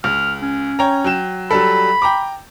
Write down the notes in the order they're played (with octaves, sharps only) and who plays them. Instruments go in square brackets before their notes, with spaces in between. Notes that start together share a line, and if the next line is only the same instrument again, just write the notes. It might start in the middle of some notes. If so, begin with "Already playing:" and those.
[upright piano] C#2 [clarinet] F6
[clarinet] C#4
[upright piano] C#5 G5 A#5
F#3 G5 E7
[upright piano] F#3 G3 A4 [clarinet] B5
[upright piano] G5 A#5 D6